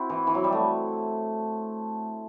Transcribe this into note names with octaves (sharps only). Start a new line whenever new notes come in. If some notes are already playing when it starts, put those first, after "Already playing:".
Already playing: C4 E4 F#4
E3
E3
F#3
G3
A3